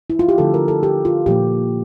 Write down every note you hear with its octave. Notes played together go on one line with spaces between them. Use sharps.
E4
F4
G4
D3 F3 A3 A4
A#4
A4
G4
F4
A#2 F3 A#3 G4